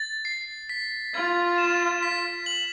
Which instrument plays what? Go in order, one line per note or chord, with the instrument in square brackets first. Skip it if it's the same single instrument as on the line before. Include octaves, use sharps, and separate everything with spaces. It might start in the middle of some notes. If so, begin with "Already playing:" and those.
Already playing: [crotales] A6
C7
B6
[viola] F4 [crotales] G#6
[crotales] E7
B6
F#7